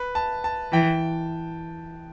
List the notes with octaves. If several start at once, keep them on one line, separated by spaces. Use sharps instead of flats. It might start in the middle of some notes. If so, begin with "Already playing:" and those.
Already playing: B4
A5
A5
E3 G5